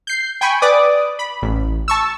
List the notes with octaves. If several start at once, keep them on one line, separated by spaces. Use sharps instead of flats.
G6 C7
G5 G#5 B5 C#6
B4 D5 D6 D#6
B5
A1
A5 C#6 E6